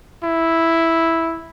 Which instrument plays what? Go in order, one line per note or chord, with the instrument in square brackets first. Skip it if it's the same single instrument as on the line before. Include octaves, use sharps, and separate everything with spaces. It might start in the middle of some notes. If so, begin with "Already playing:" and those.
[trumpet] E4